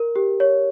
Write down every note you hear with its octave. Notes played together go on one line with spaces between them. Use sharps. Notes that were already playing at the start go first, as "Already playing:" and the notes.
Already playing: A#4
G4
C#5